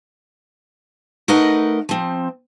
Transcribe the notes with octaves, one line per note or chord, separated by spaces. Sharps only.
A3 D#4 A#4 B4 D#5 F#5
F3 C4